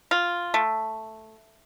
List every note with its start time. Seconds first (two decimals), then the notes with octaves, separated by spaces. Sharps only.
0.11 F4
0.54 A3